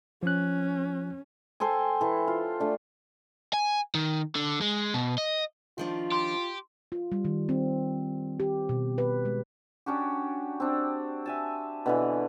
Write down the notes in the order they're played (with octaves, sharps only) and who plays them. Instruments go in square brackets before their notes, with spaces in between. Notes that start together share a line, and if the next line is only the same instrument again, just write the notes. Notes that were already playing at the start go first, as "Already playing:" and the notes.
[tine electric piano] F3 F#6 [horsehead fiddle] C#4
[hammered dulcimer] A4 C5 G5 G#5
E3 A4
F4
A3 D4
[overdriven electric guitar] G#5
D#3
D3
G#3
B2
D#5
[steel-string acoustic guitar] D#3 F3 D4 [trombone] F4
[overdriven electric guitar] G4 [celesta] C6
[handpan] F4
G3
D#3
C4
G4
B2
B4
G#3
[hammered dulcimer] C#4 D4 F#4 G4
C4 D4
E5 G#5 A5
B2 D3 E3